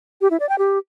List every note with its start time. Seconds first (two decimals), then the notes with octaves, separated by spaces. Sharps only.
0.21 G4
0.31 E4
0.40 D5
0.49 G5
0.58 G4